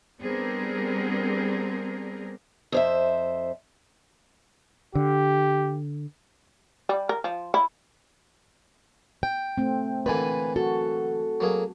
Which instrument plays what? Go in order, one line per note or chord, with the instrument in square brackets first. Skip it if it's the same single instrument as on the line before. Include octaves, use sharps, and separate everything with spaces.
[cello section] G3 B3 C4 D4 G#4 A#4
[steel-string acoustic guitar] F2 C5 E5
[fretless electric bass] D3 [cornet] G4
[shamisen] G3
A#4
F3
E4
[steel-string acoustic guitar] G5
[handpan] A3 C4
[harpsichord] A#2 D3 E3 [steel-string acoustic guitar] B4 G#5
[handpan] F#4 [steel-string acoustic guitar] A4
[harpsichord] F#3 A#3 G#4